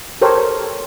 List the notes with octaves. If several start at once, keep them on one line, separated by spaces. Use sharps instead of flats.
G4 A4 A#4 C5 C#5